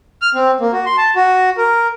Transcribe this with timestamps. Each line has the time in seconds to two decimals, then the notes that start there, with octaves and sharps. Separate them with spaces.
0.22 F6
0.35 C4
0.60 A#3
0.72 F#4
0.86 C6
0.98 A5
1.16 F#4
1.57 A#4